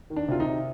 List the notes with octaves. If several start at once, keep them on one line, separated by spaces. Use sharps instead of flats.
D#3
D4
C3 F4
D#4
C3